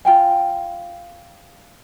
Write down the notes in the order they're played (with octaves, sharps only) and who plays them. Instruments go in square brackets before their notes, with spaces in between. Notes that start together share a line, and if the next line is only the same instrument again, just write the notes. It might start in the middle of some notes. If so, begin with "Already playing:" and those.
[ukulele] F4 G5 G#5